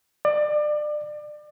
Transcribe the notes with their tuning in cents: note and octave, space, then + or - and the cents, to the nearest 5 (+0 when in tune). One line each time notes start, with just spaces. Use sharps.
D5 +30